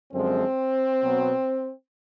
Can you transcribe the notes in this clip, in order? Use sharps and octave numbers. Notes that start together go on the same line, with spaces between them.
F#2 D3 F3 G#3 C4
B2 F#3 B3